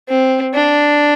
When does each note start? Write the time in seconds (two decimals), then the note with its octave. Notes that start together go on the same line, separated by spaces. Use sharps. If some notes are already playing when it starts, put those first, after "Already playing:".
0.09 C4
0.54 D4